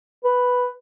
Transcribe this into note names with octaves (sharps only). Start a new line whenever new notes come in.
B4